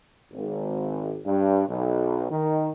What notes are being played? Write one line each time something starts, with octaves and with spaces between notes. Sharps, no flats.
G#1
G2
B1
D#3